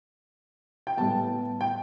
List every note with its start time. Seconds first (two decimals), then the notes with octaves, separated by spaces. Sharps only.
0.87 G5
0.97 A2 G3 B3 A5
1.61 G5